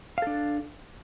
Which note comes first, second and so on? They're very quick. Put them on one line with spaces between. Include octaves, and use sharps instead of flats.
F5 A4 D4